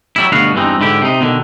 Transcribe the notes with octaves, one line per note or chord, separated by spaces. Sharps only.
F#3 G3 E4
D2 G2 B2 B3 F#4 F5
E2 G2 E3 C4 D#4
G#2 D3 E4 G4
C3 D#4
B2 D3 D#3